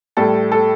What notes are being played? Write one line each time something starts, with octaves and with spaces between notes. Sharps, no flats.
A2 G3 A4
A4